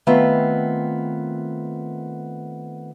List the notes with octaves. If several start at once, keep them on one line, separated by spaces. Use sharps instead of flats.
D#3 A3 B3 C4 F4